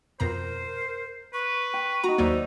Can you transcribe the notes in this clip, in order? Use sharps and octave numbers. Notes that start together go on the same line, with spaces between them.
F2 B2 A#4 C5 A#5
B4 C#6
G5
D#4 F#4 A#5
D#2 F#3 A#3 D#4 C5 D5 E6